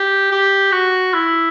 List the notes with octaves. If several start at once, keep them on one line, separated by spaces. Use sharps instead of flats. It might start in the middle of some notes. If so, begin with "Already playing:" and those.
Already playing: G4
G4
F#4
E4